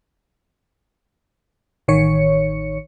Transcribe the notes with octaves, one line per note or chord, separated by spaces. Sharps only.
A1 D#3 C#5 C#7